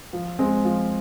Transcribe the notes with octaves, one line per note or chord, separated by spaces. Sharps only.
F3
G#3 C4
F3